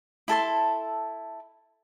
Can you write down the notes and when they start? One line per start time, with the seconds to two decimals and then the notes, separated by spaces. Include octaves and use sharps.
0.28 E4 A4 A5 C6